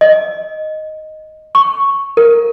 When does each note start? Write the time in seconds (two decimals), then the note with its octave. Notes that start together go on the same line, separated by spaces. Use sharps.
0.01 D#5
1.55 C#6
2.17 A#4